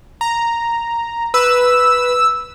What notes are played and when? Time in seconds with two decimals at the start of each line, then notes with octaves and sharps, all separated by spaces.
0.21 A#5
1.34 B4 E6